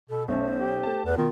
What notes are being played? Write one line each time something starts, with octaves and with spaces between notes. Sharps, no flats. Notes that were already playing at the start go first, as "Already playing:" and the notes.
B2 A4
B1 A3 C#4 C5
G4
A3 A5
E2 B4
B2 D#3 F4